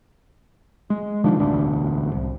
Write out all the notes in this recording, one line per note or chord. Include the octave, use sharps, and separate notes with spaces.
G#3
C3 D#3 F3 D4
E1 A1 D2 D4
C2